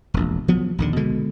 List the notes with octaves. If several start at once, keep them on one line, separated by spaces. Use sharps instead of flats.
E1 A#1
F3 F#3 B3
A#1 D#2 D3
B2 D3 G#3